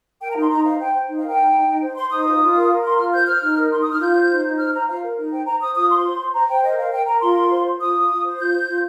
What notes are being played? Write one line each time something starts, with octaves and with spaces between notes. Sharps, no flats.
A#4 G5
A#5
D#4 C6
D#4 A#5
C5 F5
C5 G5
C5
D#4
F5
A#4
G5
D#4
D#4
D#4
C5
C5 C6
D#4 D#6
F4
F4
A#4
A#4
F4 C6
F4 F6
C5 G6
C5 F6
D#4
A#4
D#4 C6
D#6
D#4 F6
F4 G6
C5
D#4
D#4
C5 F6
C5 A#5
F4 F5
A#4
D#4
C5 G5
C5 A#5
C5 D#6
F4 D#6
C5 C6
C5
C5
C5 A#5
C5 G5
A#4 D#5
A#4 F5
A#4 G5
A#4 A#5
F4 C6
F4
C5
C5
F4 D#6
F4
F4
C5
F4 G6
C5
F4